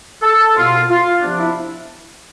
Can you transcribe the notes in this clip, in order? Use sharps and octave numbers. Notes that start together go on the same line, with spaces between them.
A4
C2 B2 B3 F4
F4
C3 F3 B3 D4
E4